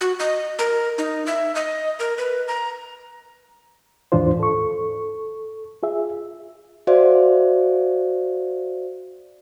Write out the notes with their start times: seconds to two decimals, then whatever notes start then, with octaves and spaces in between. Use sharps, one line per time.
0.01 F#4
0.20 D#5
0.59 A#4
0.98 D#4
1.26 E5
1.55 D#5
1.99 A#4
2.18 B4
2.48 A#5
4.12 D#2 G#2 E3 D4 F4 C5
4.39 A4 C#6
5.83 F4 G#4 E5
6.87 F#4 C5 D5 E5 F5